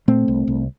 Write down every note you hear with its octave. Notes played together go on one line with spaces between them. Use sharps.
A#2 A3 C4
C2
C2